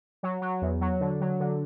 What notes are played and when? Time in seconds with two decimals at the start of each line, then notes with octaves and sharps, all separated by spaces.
0.23 F#3
0.42 F#3
0.62 E2
0.81 F#3
1.00 D3
1.21 F#3
1.40 D3